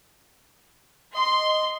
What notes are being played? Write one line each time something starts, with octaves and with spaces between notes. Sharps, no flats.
D#5 C6